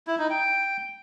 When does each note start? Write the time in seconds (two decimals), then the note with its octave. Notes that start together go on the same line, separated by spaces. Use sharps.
0.07 E4
0.19 D#4
0.30 G5